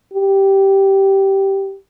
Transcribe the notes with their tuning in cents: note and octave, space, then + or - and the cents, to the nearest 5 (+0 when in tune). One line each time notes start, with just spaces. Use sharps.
G4 -10